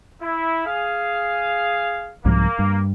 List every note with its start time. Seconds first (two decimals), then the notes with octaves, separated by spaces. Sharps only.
0.22 E4
0.66 G#4 F5
2.25 C2 G#2 F3 A#3
2.59 G2